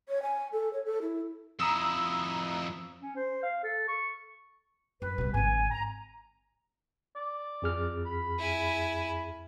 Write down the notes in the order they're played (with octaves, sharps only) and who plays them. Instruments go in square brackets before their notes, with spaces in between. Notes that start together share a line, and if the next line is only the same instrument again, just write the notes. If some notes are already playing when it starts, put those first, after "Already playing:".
[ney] C#5
G#5
A4
C#5
A4
E4
[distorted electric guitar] F2 E4 [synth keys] A#5 D#6 E6
[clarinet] C#4
C5
F5
A4
C#6
[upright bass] F#2 [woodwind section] B4
[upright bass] C2 B2
[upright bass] G#1 D3 [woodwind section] G#5
[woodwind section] A#5
[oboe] D5
[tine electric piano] F2 G#4 F6
[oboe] B5
[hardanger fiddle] E4 G#5